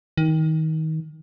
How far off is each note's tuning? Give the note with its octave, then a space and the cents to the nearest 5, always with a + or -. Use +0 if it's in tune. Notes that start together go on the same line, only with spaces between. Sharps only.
D#3 +25